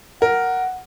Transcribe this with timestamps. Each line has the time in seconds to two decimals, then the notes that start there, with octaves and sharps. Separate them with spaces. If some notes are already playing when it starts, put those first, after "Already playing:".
0.22 A#4 F#5